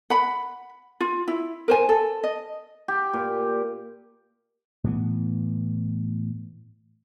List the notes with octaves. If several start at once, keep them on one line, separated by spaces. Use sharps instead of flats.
F#5 B5
F4
E4
A#4 C5 G#5
A4
D#5
G4
A#2
A2 E3 B3